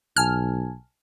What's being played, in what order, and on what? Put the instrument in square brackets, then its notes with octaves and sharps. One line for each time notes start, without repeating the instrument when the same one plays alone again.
[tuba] B1 [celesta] G#5 A5 G#6 [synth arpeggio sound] F6